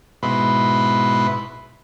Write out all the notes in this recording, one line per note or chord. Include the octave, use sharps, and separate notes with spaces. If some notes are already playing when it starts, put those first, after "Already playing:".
G#2 B2 E4 B4 B5 C6